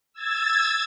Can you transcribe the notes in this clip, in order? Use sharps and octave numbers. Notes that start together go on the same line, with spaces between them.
E6 G#6 A6